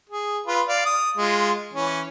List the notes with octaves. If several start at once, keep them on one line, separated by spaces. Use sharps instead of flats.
G#4
F4 B4
D5 F5
D#6
G#3 F4
E3 C#4